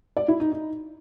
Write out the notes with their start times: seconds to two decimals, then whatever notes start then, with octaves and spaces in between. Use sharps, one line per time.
0.17 D5
0.28 E4
0.40 D#4
0.52 D#4